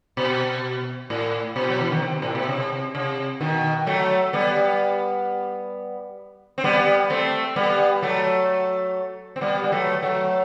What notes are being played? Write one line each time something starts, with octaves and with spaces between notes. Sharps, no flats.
B2
A2
B2
F#3
E3
D#3
C3
A2
B2
C3
C3
B2 D#3
F#3 A3
G3 B3
C4
G3 B3
A3 C4
G3 B3
F#3 A3
C4
G3 B3
G3
F#3 A3
F#3 A3